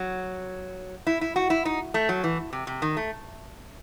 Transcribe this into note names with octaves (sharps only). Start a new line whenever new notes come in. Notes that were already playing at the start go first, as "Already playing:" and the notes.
Already playing: F#3
E4
E4
F#4
E4
D#4
A3
F#3
E3
C3
C3
D#3
A3